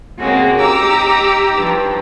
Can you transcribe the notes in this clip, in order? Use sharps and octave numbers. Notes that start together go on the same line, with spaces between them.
C#3 G#3 A#3 C4 F#4
D#4 G4 A#5 D6 E6
G2 F3